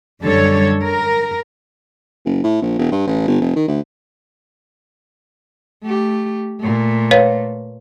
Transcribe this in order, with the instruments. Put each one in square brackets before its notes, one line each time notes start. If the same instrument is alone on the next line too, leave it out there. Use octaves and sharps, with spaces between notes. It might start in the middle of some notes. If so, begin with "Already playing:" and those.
[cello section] F#2 D3 G3 A4 C#5
A#4
[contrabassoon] F#1
A2
A#1
E1
G2
A1
G1
F1
D#3
D2
[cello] A3 G4
A#2 A3
[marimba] B4 C#5 F5